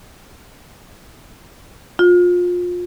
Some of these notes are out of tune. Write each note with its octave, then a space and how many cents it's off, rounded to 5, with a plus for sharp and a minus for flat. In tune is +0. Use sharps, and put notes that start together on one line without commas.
F4 +25